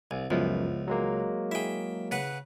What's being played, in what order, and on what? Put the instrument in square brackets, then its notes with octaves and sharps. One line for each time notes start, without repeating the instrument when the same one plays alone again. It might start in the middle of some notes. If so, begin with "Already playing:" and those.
[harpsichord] C2 [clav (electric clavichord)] G#5
[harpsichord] C#2 [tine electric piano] F#2 [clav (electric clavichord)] F3 B3 E4
[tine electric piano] F#3 G#3 A#3
[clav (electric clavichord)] E4 G#4 [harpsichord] E5 G5
[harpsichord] C#3 B4 F#5